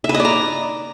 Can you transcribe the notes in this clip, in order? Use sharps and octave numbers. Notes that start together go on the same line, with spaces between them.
E5
B4
D#5
D5
A#5